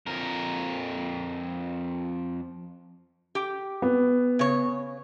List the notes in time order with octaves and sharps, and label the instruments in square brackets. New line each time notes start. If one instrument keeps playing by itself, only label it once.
[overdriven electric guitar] F2 A#4
[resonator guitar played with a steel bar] G4 G5
[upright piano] B3
[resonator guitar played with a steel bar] C#3 C#5